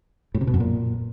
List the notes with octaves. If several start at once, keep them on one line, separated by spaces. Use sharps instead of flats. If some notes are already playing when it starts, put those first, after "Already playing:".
A2
C3
B2
F#2
A#2